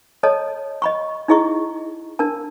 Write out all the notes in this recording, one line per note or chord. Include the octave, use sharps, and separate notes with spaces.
A4 C#5 D#5 A5
D#5 B5 C#6
D#4 E4 G#4 D#5 C#6
D4 A#4 A5